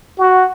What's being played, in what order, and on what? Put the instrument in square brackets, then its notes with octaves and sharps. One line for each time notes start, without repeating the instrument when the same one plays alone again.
[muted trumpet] F#4